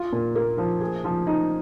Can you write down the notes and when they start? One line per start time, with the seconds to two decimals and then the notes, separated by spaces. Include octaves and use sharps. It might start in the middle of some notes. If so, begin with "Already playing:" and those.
Already playing: F4
0.12 A#2
0.35 A#3
0.58 F3
0.81 G#4
1.04 F3
1.27 D#4